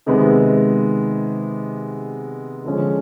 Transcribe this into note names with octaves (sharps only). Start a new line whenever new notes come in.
C3 D#3 G#3 B3
D3 F3 G#3 C#4